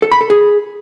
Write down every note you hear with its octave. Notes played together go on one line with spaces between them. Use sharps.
A4
B5
A4
G#4